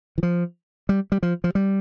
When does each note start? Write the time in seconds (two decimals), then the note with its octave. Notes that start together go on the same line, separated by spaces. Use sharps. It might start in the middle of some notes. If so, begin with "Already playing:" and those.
0.18 E3
0.23 F3
0.89 G3
1.12 G3
1.23 F3
1.44 F3
1.55 G3